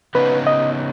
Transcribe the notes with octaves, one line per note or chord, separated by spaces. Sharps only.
C#3 B3 D#4 B4
D#5